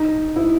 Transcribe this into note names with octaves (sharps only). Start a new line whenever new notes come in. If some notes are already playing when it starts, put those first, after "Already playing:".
Already playing: D#4
E4